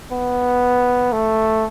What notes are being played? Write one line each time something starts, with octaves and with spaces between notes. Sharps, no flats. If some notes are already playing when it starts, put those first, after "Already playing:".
B3
A3